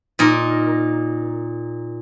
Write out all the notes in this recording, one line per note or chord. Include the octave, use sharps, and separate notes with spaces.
A#2 D#4 A#4